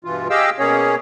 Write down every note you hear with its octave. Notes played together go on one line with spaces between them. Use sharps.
G2 B2 E3 F4
G4 G#4 D#5 F5 G5 E6
B2 A#3 C#4 G#4 C#5